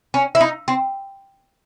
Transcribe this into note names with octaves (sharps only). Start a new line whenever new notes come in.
C#4
E4
D#4
C4